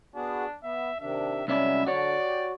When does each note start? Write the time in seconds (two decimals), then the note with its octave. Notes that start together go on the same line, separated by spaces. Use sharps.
0.15 B3 D4 F#4 G#4
0.63 B3 E5
1.00 C3 D#3 D4 E5
1.48 C2 F#3 G#3 C#4 E4 D5 E5
1.87 D3 F#4 C#5 D5
2.23 G4